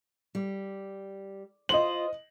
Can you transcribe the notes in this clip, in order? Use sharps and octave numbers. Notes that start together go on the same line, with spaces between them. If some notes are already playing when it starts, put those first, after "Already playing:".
G3
F4 C5 D#5 F#7